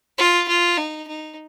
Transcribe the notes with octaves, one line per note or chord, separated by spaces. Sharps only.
F4
F4
D#4
D#4